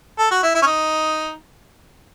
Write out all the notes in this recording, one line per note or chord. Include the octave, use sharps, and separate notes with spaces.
A4
F#4
E4
E4
C#4
D#4